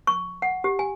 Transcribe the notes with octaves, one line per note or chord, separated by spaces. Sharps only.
C#6
F#5
G4
G#5